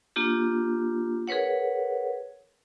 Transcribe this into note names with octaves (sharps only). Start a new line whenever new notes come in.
A#3 D4 F4 G4
G#4 A#4 B4 C#5 F#5